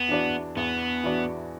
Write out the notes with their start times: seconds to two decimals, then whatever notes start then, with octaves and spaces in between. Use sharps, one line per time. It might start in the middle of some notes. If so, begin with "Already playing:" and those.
Already playing: E2 B3
0.09 E3 D4 F#4 D5
0.56 E2 B3
1.03 E3 D4 F#4 D5